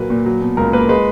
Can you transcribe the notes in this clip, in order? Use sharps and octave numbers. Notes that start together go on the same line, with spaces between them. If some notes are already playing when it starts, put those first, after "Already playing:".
Already playing: A#2 F#3 A#3 B4
A#2
F#3
B2
C#2 A#4
A#3 B4
G#3 B4